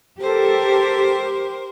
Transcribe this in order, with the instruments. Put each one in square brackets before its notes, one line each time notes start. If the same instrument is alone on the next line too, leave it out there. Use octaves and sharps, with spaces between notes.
[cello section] G4 [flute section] A4 [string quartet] A#4 C5